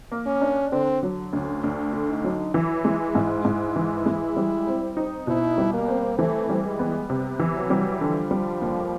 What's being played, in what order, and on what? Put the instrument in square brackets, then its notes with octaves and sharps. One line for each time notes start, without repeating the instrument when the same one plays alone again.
[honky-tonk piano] A#3
[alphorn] C#4
[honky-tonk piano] D4
[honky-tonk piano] D3 [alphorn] C4
[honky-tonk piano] F#3
[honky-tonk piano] D2 [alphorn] C#4
[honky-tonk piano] D2 [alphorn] D4
[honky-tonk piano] D3
[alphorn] D#4
[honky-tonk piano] F#3
[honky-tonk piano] E3 [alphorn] E4
[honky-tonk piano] G#3
[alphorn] E4
[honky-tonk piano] G#2
[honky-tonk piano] G#2 [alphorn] E4
[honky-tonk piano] E3
G#3
G3
C4
D#4
[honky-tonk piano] B2 [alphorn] E4
[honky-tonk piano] G3
[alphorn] A#3
[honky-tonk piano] C4
[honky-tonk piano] E3 [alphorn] A3
[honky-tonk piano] G3
[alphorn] G#3
[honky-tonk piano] B3
C3
E3
[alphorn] F#3
[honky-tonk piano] G3
[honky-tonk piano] D3 [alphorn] F3
[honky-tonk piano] G3
D#2